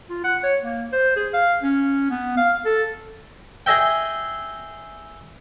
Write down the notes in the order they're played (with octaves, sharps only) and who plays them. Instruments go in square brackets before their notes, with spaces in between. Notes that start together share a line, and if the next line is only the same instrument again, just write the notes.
[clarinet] F4
F#5
C#5
A#3
C5
G#4
F5
C#4
B3
F5
A4
[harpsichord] G#4 D#5 E5 G5